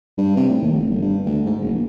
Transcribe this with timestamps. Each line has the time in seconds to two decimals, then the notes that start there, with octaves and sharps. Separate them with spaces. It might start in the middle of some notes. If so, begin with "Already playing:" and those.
0.18 G2
0.37 C3
0.50 A2
0.62 D#2
0.73 F1
0.90 G1
1.02 G2
1.26 D2
1.46 G#2
1.62 F#1
1.75 A#1